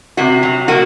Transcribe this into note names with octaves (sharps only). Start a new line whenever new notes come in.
C3 F#4
F#3
A#3 F#4